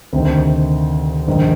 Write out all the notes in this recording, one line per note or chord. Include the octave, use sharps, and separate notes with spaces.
D2 C3 D#3
A#1 G#2 D#3